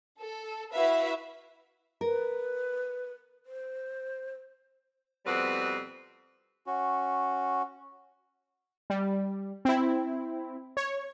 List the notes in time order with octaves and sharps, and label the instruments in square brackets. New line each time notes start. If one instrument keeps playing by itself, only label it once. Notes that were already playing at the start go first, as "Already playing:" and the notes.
[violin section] A4
E4 F#4 B4 E5 F5
[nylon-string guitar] A#4 [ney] B4
[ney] C5
[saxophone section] F2 B2 G3 C4 B4 F#5
[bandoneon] C#4 F#4
[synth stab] G3
C4 E4
C#5